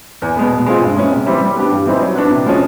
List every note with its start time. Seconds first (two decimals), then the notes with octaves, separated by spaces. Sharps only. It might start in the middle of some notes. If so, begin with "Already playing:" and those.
0.22 E2
0.36 B2 G#3 B3
0.52 B2
0.66 G#3 C4 F4 G#4
0.81 G2
0.97 E3 G#3 C#4
1.11 C3
1.26 E3 G3 C4
1.41 G3
1.56 B3 D4 G4
1.71 G2
1.86 E3 G3 C4 D#4
2.01 F#3
2.15 B3 D4 F#4 B4
2.31 C3
2.46 F3 G#3 C#4